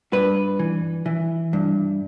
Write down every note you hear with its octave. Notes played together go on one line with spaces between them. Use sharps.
G2 B4
E3
E3
G2